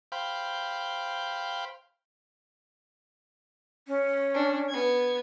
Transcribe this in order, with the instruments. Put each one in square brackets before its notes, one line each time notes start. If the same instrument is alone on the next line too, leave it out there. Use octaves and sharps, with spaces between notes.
[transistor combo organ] C5 F5 G5 B5
[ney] C#4
[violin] D4
B3 G#6